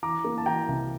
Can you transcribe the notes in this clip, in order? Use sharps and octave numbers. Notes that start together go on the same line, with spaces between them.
E3 A#5 D6
A#3
A5
E3 G5 A#5
C2